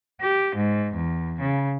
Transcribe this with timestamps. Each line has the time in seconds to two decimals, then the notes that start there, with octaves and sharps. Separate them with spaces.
0.21 G4
0.56 G#2
0.94 E2
1.40 C#3